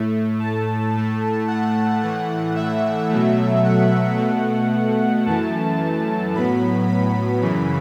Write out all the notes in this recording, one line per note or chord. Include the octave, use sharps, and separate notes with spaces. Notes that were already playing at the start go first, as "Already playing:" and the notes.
Already playing: A2 A3
A5
A2 A3
F#5
A2 E3 A3 F#5
E5
B2 F#3 A3
F#5
B2 A3
F#2 E3 A3 A5
A2 F#3 B3 B5
B5
F#2 C#3 E3